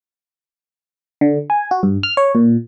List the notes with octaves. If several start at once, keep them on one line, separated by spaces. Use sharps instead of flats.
D3
G#5
F#4
G2
F6
C#5
A#2